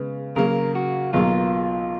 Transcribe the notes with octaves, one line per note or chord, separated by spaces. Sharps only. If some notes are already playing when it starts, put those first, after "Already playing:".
Already playing: C#3 G#3 B3
C#3 F#3 A#3 A#4
F#4
B1 B2 F#3 A#3 F4